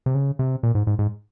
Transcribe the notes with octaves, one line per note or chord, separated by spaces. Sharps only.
C3
C#3
C3
A#2
G#2
G#2
G#2